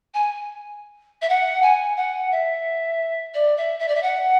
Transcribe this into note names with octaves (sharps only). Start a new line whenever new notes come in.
G#5
E5
F#5
G#5
F#5
E5
D5
E5
E5
D5
E5
F#5